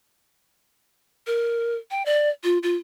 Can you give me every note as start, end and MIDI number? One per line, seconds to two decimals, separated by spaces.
1.27 1.75 70
1.91 2.05 79
2.06 2.30 74
2.44 2.58 65
2.63 2.75 65